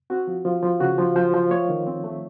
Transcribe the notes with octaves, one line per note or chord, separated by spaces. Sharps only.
C4 F#4
F3
F3
F3
C#3 F#4
F3
F3 C5
F3
A3 C#5
D#3
C4
A3